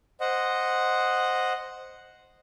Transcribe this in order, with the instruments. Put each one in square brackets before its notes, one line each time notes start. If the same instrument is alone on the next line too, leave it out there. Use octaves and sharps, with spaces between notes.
[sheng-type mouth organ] C5 D#5 F#5